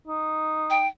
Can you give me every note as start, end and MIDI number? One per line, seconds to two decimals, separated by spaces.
0.07 0.86 63
0.70 0.87 79